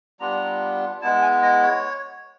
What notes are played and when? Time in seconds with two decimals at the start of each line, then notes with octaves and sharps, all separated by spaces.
0.20 G3 B3 D4 F4 A#5
1.02 G#3 B3 E4 A5
1.22 G#5
1.42 D#5
1.63 C#5